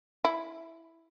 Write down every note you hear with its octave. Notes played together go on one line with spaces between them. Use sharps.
E4